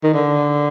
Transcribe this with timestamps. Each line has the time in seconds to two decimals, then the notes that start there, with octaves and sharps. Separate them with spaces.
0.03 D#3
0.14 D3